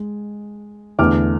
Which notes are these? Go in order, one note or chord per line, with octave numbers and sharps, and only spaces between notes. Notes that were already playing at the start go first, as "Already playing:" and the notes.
Already playing: G#3
E2 D3 A3 D6 F6